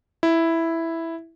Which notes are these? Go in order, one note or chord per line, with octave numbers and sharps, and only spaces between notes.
E4